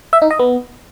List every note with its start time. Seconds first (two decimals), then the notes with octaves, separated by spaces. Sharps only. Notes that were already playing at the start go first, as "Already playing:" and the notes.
0.13 E5
0.22 D#4
0.31 D#5
0.39 B3